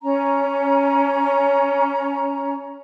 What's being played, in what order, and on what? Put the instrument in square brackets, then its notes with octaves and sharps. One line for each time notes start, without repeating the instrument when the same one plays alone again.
[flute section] C#4 A#5